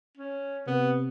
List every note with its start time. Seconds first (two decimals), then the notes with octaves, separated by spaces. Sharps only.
0.17 C#4
0.67 C3 B3